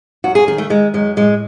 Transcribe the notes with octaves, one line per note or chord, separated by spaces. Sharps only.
F#2 F#4
G#4
D#3 G#4
A3
D#3 G#3
F#2 G#3
A2 G#3